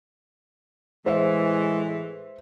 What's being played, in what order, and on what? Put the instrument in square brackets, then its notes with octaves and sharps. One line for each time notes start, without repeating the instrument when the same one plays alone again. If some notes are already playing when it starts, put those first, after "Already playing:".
[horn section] A2 E3 [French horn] G#3 [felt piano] C5 E5